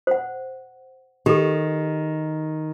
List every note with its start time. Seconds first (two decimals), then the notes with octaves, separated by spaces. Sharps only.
0.07 C5 F#5
1.26 D#3 G4 A4